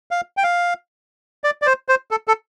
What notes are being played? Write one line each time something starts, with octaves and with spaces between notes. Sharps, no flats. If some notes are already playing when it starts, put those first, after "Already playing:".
F5
G5
F5
D5
D5
C5
C5
A4
A4